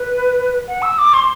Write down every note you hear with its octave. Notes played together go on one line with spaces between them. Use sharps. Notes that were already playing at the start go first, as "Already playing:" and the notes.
Already playing: B4
F#5
E6
D6
C6